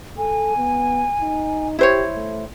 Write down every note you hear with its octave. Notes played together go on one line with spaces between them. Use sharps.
A4 G#5
B3
D#4
E4 G4 C5 C#5
A3